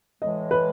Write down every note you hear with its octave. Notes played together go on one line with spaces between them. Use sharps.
A2 E3 G#3 D#5
B4